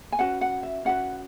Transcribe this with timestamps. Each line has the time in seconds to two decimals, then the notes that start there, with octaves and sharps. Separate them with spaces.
0.12 G#5
0.19 C#4 F#4 B4 F#5
0.41 F#5
0.63 E5
0.85 C#4 F#4 B4 F#5